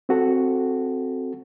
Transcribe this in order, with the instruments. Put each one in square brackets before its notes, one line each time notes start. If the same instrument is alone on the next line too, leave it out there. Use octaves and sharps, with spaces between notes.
[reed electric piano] C4 F#4 A4